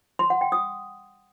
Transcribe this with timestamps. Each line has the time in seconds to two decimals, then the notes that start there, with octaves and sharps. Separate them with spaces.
0.19 C6
0.30 F#5
0.41 G5
0.52 D#6